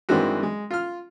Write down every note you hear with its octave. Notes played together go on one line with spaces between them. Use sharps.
G2 D#3 E3 G#3 C4 F#4
G#3
F4 F6